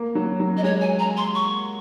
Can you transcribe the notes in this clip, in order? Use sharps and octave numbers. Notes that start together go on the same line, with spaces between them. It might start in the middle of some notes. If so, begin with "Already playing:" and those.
Already playing: A#3
F#3
F#3
D#5
G#3 C#5
G#5
A#5
C6
C#6